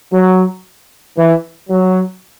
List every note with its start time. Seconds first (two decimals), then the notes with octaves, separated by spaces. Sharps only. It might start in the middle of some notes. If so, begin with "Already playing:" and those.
0.12 F#3
1.17 E3
1.70 F#3